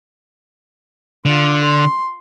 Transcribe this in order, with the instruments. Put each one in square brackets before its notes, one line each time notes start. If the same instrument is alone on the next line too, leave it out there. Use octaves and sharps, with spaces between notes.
[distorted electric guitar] D3 [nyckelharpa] F4
[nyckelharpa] C6